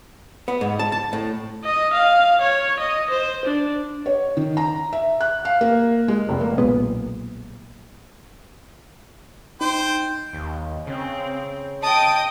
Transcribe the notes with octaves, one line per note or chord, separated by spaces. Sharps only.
B3
G#2
A5
A5
A2
D#5
F5
C#5
D#5
C5
D4
C#5
D#3
A#5
E5
F#6
F5
A#3
G#3
F1
A#3
B1 A#2 G#3 B3
D#4 C5 G5
D#2
C#3 C4
D#5 G5 A5 D#6 D7